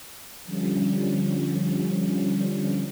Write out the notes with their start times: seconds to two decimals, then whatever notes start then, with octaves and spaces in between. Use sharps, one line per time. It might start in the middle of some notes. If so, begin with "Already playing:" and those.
0.44 D3 F3 G3 C#4